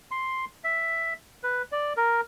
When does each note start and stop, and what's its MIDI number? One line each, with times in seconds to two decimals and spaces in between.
0.11 0.45 84
0.64 1.14 76
1.43 1.62 71
1.72 1.93 74
1.97 2.21 70